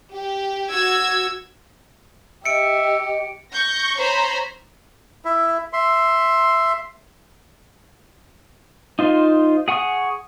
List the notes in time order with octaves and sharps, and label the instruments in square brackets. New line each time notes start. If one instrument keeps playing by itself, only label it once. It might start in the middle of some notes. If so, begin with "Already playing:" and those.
[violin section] G4
F#4 E6 G#6
[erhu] G4 [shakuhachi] D#5 [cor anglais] E5 [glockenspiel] C#7 D7
[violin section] C#6 G6 A#6
C5 C#5 A#5 B5
[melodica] E4 E5
E5 C6
[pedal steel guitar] D#4 F4 C5
G#4 F#5 G#5 C#6 D#6